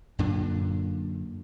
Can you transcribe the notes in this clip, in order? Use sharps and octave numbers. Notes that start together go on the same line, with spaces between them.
F#2 A#2 D3 D4